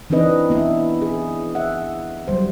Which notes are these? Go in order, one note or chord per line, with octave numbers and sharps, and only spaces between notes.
E3 C4 D4 D#4 B4 D#5
B3 E4
G#4
E5 F#5
F#3 G3 C5